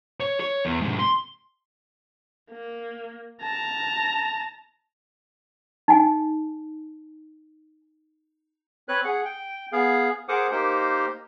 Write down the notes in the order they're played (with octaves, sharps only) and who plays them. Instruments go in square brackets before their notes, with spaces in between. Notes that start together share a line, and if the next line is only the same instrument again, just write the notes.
[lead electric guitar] C#5
C#5
E2
G#2 C3
C6
[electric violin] A#3
A5 A#5
[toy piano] D#4 G#5
[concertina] C4 B4 C#5 F#6
G#4 F#5
G5
B3 G#4 F5
G#4 A#4 C5 F#5 D6 D#6
A#3 D#4 G4 A#4 C5